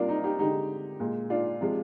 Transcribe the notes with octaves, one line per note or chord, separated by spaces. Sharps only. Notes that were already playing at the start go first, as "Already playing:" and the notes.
Already playing: C3 G3 A#3 D4 F4 A#4
D#4
D#4 G4
D3 G#3 D#4 G4
A#2 G#3
D4 F4
C3 F3 G#3